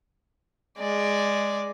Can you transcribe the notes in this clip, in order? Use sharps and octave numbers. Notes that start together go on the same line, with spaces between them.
G#3 D5